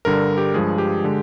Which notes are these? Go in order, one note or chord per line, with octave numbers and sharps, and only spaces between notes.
G2 D3 G3 A#4
G4
G2 F3 G#3 G#4
G4
D3 G#3